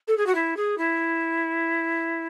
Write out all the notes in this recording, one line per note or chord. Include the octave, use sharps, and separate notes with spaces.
A4
G#4
F#4
E4
G#4
E4